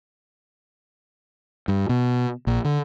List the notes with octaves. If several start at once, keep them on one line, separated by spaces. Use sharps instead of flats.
G2
B2
A#1
D3